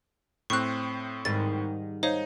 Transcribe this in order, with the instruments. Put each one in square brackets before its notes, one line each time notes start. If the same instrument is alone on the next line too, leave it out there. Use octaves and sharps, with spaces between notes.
[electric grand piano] A2 C4 [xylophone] C#6 F#6
[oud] G#2 D#3 G3 [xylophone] A6
[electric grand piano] D#4 [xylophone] C5 C#5 F5